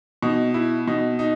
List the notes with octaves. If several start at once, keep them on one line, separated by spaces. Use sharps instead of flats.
B2 D#4
E4
B2 D#4
D#4